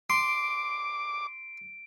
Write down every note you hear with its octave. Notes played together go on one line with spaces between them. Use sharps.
C6 D6 D7